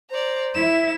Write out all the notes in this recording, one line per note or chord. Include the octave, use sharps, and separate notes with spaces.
C5 D5 A#5
E4 E5 E7